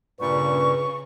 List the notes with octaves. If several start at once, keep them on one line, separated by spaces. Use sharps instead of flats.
G2 A#2 C#3 G3 B4 C#6